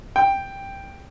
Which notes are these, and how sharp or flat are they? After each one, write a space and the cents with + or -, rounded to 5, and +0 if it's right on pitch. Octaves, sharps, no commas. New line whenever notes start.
G5 +5